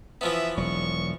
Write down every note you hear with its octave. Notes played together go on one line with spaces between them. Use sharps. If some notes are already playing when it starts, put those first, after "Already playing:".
E3 F3 B3 E5
E1 F#3 C#6